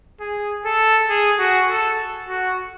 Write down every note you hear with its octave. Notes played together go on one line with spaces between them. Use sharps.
G#4
A4
G#4
F#4
A4
F#4